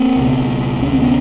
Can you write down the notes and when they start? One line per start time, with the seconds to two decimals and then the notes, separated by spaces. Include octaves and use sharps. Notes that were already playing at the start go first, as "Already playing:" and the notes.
Already playing: A#3 C4
0.16 C#2 B2
0.82 D2 C3 C#4
0.92 C4
1.02 B3 C#4